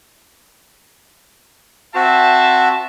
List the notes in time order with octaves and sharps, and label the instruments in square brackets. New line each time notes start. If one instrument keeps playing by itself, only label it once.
[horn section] C4 E5 A5 [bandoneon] F#4